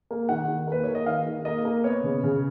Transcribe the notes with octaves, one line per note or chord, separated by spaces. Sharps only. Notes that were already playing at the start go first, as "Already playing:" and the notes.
A#3
D#3 F#5
D#3
A#3 B4
A#3 C#5
D#5
D#3 F5
D#3
A#3 D#5
A#3
B3 C#5
C#3
C#3